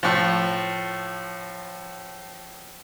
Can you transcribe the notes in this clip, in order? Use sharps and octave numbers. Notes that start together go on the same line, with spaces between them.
A2 F3